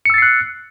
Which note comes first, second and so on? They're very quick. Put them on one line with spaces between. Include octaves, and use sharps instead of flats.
C#7 E6 A6 C7 F#6